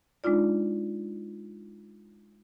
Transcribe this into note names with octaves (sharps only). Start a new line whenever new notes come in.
G#3 D4 D#4 F4 D5